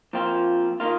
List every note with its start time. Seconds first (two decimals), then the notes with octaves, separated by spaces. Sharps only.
0.13 A#2 F3 C4 F4
0.80 D#3 A#3 F4